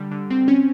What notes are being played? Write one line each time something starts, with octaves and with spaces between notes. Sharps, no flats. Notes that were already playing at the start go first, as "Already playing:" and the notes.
Already playing: D3 G3
D3
C4
C#4